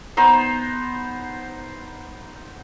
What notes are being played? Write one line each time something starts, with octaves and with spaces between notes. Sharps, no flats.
B3 D#4 C5